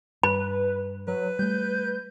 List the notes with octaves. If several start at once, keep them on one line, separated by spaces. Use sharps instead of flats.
G2 B4 B5
F#3 B4
G3 A3 G6